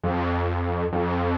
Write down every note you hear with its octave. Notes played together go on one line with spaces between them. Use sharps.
F2
F2